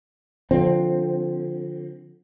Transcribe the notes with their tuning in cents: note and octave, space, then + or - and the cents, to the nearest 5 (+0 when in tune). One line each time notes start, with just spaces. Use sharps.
D3 +0 F3 +15 C4 +5